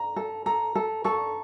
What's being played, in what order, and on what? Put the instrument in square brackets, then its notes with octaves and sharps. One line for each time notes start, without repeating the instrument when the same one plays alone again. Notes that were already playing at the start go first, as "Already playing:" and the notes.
Already playing: [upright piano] A#5
[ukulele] A4
[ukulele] A4 [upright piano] A#5
[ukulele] A4
[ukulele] A4 [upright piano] C#6